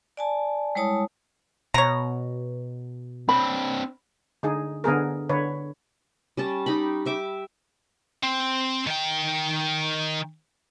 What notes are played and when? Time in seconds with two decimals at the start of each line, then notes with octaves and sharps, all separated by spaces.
0.17 D5 G#5 A5
0.75 G3 G#3 E4 C#5 A5 D#6
1.74 B2 C#5 A#5
3.29 C4 D4 B5
4.43 D3 D#4 G#4
4.84 D3 B3 G#4 A#4
5.29 D3 B4 C#5
6.37 G3 C#4 A5
6.66 D#4 G4 B5
7.06 G4 E5 D6
8.23 C4
8.87 D#3 G5